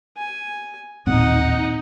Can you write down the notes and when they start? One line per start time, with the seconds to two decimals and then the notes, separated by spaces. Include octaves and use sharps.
0.17 G#5
1.07 A1 D#2 A#2 C4 D#4 D#5 F#5